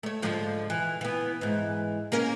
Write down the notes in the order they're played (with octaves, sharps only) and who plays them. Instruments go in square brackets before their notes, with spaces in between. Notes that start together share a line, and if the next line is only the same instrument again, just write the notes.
[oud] A3 C#5
G#2 D3 F3
E3
E3 B3
G#2 E3
A#3 C#4 A#4